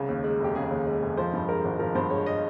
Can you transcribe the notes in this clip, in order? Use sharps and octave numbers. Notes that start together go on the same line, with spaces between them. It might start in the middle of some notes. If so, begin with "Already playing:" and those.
Already playing: C2 C#3
D#2
G#3
F1 G4
C#3 G#4
D#2
G#3
F1
F3 C5
G2
G#3 A#4
G#1
F3 A#4
G2 C5
G#3 C#5
D#5